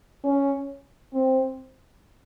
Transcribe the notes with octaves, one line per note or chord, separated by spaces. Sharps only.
C#4
C4